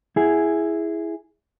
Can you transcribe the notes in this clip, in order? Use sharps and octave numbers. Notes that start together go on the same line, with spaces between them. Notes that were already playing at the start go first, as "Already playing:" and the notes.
E4 G#4